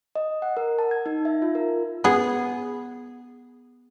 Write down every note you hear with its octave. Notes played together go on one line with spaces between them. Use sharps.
D#5
F#5
A#4
A5
G#6
D#4
E5
F4
A#4
B3 G#4